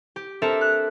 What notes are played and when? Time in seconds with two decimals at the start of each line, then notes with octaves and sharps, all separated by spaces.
0.16 G4
0.42 C4 D4 A4 A#4 E5
0.61 F#6